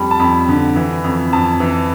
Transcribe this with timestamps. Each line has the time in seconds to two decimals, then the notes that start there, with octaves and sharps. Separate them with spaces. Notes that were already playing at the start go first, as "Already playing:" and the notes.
Already playing: F2 G3 A5 B5
0.11 A5
0.20 F2 B5
0.49 D3
0.76 E3
1.04 F2
1.33 F2 A5
1.60 E3